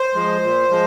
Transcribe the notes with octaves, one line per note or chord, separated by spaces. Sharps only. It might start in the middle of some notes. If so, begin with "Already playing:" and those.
Already playing: C5
F3 G#3
A#2
F3 G#3